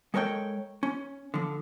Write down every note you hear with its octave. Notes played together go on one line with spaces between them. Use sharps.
G#3 A4 A#4 C#5 G5
C#4
D3 F3